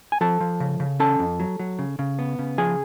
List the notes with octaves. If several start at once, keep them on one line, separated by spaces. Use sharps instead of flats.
G#5
F3 A4 A5
F3
C#3
C#3
C#4 A4 A5
F2
F#3
F#3
C#3
C#3
B3
C#3
F3 G#4 G#5